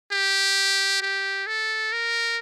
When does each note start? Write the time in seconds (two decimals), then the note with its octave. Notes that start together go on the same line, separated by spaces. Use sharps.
0.12 G4
1.02 G4
1.47 A4
1.92 A#4